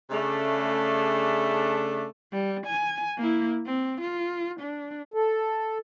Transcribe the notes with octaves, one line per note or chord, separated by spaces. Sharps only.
C#3 A3 D4
G3
G#5
A#3 E4
C4
F4
D4
A4